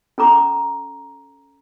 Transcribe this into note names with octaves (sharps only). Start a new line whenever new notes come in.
C#4 A4 A#5 D6